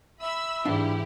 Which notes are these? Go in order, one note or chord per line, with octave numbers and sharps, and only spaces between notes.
E5 B5 E6
G#2 E3 D4 E4 G4 F5